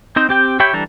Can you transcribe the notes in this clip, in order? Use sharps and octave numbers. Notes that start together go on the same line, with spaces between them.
C4 D#4 C5
C4 G4 G5
G4 C#5 E5 G5 B5
E3 G3 D4 A4 A#5